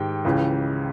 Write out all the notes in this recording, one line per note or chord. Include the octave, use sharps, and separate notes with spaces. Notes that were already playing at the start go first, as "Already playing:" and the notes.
Already playing: G#2 D#3 G4 G5
C#2 C#3 E3